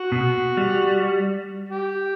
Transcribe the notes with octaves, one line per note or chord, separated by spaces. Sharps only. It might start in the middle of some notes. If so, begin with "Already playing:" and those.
Already playing: F#4
B2
G3
G4